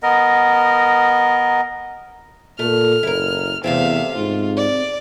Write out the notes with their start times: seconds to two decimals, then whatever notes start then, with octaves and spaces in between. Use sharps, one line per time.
0.03 B3 A#4 D#5
2.59 A#2 A3 F6
3.03 F#1 E4 A#4
3.64 E2 C3 A3 C4 E5 F5
4.16 G#2 F4
4.57 D5